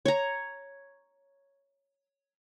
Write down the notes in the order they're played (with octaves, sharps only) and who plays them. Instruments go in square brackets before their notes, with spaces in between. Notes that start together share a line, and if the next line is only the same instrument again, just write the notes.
[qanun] C#5 A#5